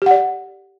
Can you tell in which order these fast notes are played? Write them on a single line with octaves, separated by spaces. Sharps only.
G4 F#5 D5